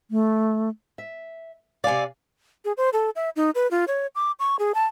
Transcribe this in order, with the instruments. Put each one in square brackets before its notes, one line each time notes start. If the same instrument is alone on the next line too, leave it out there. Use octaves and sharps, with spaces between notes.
[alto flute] A3
[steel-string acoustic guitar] E5
[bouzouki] C3 D5 [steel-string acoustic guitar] F5 G#5
[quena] G#4
C5
A4
E5
D#4
B4
F4
C#5
D6
C#6
G#4
A5